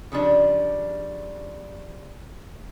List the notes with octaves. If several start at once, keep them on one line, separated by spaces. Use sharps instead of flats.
C#3 F3 G3 D4